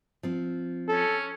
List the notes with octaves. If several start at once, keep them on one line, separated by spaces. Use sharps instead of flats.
F3 C4
C#4 A4